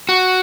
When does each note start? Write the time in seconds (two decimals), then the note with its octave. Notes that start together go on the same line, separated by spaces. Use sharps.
0.09 F#4